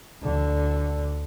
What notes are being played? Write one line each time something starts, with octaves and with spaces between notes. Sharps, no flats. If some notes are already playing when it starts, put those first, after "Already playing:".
D2 D3